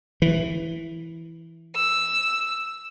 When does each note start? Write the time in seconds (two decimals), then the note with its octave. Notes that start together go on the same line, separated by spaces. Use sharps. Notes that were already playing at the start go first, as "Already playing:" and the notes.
0.22 E3
1.75 E6